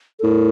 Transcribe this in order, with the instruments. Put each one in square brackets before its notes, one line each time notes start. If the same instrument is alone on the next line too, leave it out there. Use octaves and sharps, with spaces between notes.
[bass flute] A4
[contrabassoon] A2 [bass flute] A#4